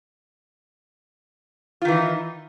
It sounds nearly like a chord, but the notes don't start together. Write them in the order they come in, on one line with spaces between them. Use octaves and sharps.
F4 D#3 E3 D#4